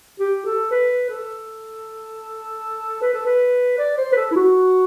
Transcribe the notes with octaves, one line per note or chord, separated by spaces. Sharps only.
G4
A4
B4
A4
B4
A4
B4
D5
C5
B4
A4
E4
F#4